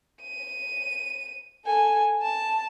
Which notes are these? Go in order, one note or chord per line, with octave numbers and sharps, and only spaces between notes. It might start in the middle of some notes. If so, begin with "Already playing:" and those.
D#7
A4 G#5
A5